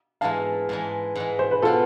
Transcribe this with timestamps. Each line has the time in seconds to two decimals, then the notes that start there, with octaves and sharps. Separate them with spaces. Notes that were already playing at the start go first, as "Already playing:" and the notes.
0.21 G#2 E3 G#3 F5 A5
0.69 G#2 E3 G#3
1.15 G#2 E3 G#3
1.39 C5
1.51 B4
1.62 B2 B3 F4 A4